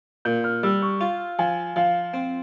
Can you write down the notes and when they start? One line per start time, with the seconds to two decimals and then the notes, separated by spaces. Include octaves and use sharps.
0.25 A#2 G6
0.44 F6
0.63 G3 E6
0.82 C#6
1.01 F4
1.39 F3 G#5
1.76 F3 F5
2.14 C4